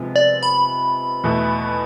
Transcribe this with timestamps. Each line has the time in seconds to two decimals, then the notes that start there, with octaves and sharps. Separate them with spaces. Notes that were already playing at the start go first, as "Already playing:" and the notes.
Already playing: C3 F3 G#3 B3
0.16 D5
0.43 B5
1.24 E2 B2 A3 E4